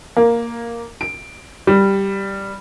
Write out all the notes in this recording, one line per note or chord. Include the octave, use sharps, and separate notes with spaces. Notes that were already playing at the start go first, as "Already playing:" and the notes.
A#3
D7
G3